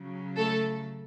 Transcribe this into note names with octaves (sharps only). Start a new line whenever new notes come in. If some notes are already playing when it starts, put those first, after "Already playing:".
Already playing: C#3 F#3
A3 A4